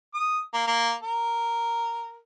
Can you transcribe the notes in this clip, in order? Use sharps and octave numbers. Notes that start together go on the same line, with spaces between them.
D#6
A#3
A#3
A#4